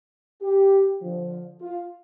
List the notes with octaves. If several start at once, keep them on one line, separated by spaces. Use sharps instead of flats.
G4
D3 F3
F4